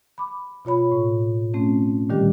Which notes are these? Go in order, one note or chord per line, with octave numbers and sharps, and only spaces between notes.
B5 D6
B2 F4 C#5 B5
A2
A3 C4 C#4
A#2 D3 D#3 G3 G4